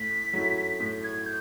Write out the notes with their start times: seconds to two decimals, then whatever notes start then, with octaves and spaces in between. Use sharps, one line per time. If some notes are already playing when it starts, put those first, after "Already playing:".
Already playing: A2 B6
0.33 F#3 A3 C#4 E4
0.80 A2
1.03 G#6
1.25 G6